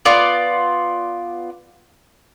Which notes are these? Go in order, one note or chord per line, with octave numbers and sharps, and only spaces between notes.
B3 F4 D5